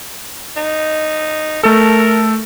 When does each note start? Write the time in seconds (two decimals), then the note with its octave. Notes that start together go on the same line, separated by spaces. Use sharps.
0.57 D#4
1.63 A3 A4 A#4